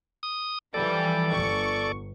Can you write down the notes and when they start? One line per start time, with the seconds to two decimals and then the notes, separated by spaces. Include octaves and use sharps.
0.23 D#6
0.74 E3 F3 G3 A4 D5
1.32 G1 C#6